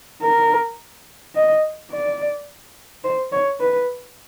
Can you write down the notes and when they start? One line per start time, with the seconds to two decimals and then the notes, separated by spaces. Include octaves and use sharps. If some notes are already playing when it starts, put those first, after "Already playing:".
0.22 A#4
1.35 D#5
1.92 D5
3.04 C5
3.32 C#5
3.60 B4